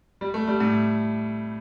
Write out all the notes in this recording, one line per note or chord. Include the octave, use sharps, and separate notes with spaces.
G3
A3
G3
A2